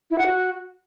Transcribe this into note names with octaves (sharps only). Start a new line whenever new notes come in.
E4
F#5
F#4